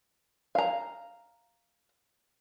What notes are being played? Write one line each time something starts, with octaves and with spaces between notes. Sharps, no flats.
F5 A#5